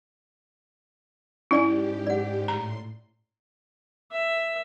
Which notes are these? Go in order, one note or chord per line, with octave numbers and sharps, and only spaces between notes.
G#2 C#4 E4 G4 D5 G#5
D5 F#5
A2 A#5 C6
E5